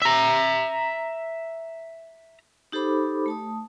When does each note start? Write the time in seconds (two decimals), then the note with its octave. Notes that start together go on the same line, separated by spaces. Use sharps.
0.02 E5 A#5
2.72 D#4 G4 A4 C5 B5 D6
3.26 A3 A5 D#6